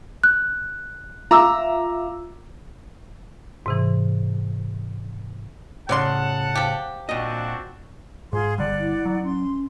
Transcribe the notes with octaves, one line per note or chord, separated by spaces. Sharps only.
F#6
F4 E5 A#5 D6 E6
G#2 C3 E3
A2 C#3 C#5 D5 F#5 A5 C6
F3 G4
A#2 C4 D4 F#4 D#5
G#2 F4 G#4 C6
G1 D3 G3 D5 F#5
E4
F#3
C#4 C6